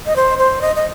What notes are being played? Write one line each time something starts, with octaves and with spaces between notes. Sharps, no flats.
D#5
C5
C5
D#5
D#5